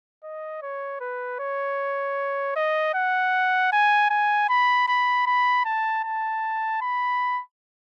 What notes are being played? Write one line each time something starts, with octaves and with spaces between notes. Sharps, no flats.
D#5
C#5
B4
C#5
D#5
F#5
G#5
G#5
B5
B5
B5
A5
A5
B5